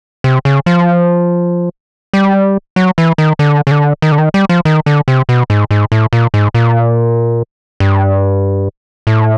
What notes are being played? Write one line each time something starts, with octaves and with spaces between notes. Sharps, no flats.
C3
C#3
F3
G3
F#3
E3
D#3
D3
C#3
D3
D#3
D3
D#3
G3
F3
D#3
D3
C3
B2
G#2
G#2
A2
A#2
G#2
A#2
G2
A2